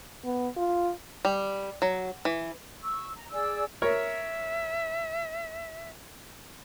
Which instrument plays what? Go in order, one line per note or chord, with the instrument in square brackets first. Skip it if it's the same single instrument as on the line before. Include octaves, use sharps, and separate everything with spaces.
[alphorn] B3
F4
[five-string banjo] G3
F#3
E3
[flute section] C#6 E6
A#5
G#4 D5 E6
[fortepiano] A#4 C#5 [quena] E5